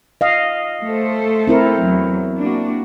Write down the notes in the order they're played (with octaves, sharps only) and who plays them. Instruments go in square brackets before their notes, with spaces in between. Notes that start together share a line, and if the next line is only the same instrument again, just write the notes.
[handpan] D#5 F5
[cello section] A3 A4 C5
[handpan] C4 E4 A#4
[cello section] E2 F#3
A#3 D4 F#4